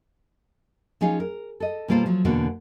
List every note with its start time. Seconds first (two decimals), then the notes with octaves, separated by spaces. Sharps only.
1.01 F3 C#4 D#4 G#4 F5
1.20 A#4
1.60 A4 D#5
1.88 B2 G3 A#3 F4 A4 C5
2.06 F3 F#3 A3
2.25 E2 B2 D3 A#3 C4 F#4